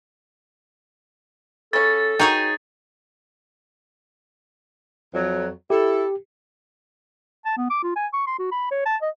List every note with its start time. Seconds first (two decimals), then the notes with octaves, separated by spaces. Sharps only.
1.73 C#3 C#4 A4 A6
2.19 D#4 F#4 G#4 A#4 C#5 G5
5.14 F2 F#3
5.70 E4 G4 A4
7.46 A5
7.57 B3
7.70 D6
7.83 F4
7.96 G#5
8.14 C#6
8.27 C6
8.39 F#4
8.52 B5
8.71 C#5
8.86 A5
9.02 D#5